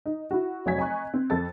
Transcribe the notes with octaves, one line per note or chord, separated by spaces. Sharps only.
D#4
E4 F#4
F1 F#3 C#5 G#5 G#6 B6
D#5 G#5 A#5 C#6 F#6
C4
F2 A4 A6